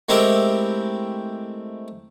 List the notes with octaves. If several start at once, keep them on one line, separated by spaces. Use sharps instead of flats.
G#3 A3 C4 E4 G4 A#4